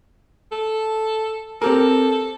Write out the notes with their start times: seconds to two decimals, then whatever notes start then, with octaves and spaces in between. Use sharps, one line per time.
0.52 A4
1.62 C4 G4 A4 A#4